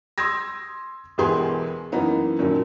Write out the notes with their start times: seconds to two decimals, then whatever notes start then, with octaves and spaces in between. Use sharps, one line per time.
0.18 C6 D#6 E6 G#6 A#6
1.18 E1 E2 G4 G#4 B4 C6
1.92 F#2 E3 A#3 B3 D#4
2.39 F#2 A#2 D#3 F3 F#3